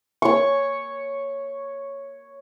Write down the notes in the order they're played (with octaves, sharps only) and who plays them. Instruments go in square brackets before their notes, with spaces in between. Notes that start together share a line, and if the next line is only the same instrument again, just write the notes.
[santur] C#5 C#6